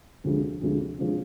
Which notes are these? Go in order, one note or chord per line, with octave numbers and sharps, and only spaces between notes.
D2 C3 F3 G#3 D4
D2 C3 F3 G#3 D4
C3 F3 G#3 D4